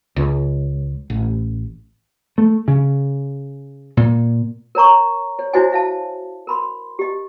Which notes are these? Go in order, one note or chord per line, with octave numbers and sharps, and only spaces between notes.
C#2
A1
A3
C#3
A#2
A#4 C#5 A#5 C#6
C#5
E4 F#4 C5 C#5 D#5 G#5
E5 F5 A5
A#4 B5 C6
G4 D#5